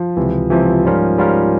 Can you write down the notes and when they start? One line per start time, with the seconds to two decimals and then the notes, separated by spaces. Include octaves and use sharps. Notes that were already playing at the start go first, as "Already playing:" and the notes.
Already playing: F3
0.17 C#2 C3 E3
0.50 C#2 C3 E3 F3
0.84 G#2 G3 C#4 F4 A#4
1.18 G#2 G3 C#4 F4 A#4